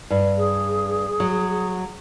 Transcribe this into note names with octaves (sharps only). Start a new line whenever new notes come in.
G2
G#4
F#3